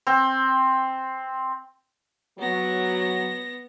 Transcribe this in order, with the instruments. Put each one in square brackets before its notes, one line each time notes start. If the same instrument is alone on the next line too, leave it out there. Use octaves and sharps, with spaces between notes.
[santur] C4
[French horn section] F#3 [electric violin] B3 A#6